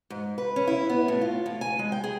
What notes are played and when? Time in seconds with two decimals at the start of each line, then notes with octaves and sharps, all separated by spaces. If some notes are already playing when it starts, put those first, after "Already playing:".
0.10 G#2
0.38 B4
0.56 C#4
0.67 E4
0.90 B3
1.08 A2
1.21 F4
1.46 A2
1.61 G#5
1.79 G#3
1.92 G5
2.04 G#4